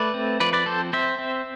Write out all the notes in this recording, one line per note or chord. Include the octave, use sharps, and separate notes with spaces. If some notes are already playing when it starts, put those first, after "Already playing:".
Already playing: A3 B4 D5
C4
F3 B4 D5
B4 D5
C4 A4 C5
C4 C5 E5
C4